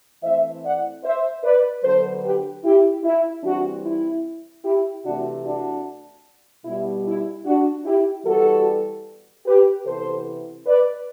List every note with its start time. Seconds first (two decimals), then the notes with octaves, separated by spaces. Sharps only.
0.23 E3 A3 C4 C5 E5
0.63 D5 F#5
1.04 C5 E5
1.44 B4 D5
1.84 D3 F#3 B3 A4 C5
2.23 G4 B4
2.64 E4 G4
3.04 E4
3.44 E3 G3 C4 D4 F#4
3.84 E4
4.64 E4 G4
5.04 C3 E3 A3 D4 F#4
5.44 D4 F#4
6.64 B2 G3 B3 E4
7.05 E4
7.45 D4 F#4
7.85 E4 G4
8.25 E3 G3 B3 F#4 A4
9.45 G4 B4
9.86 C3 E3 B3 A4 C5
10.66 B4 D5